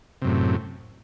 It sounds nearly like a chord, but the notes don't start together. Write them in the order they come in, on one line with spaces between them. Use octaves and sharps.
C3 F#2 A2